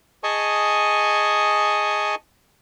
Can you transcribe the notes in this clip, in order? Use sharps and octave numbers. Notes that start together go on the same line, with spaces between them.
G#4 D#5 G#5 A5 C#6 D#6